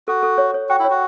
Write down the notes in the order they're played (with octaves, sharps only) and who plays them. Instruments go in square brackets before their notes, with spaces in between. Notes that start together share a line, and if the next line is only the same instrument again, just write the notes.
[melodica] F#4 [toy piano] A4
[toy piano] A4
C#5
C#5
[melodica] F#4 [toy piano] G5
[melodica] E4
[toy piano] C#5
[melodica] F#4